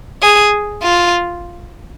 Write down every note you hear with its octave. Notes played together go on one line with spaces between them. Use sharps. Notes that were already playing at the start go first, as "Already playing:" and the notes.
G#4
F4